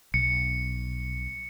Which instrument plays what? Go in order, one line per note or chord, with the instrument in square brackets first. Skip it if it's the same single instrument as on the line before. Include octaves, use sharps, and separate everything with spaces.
[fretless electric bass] B1 [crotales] C#7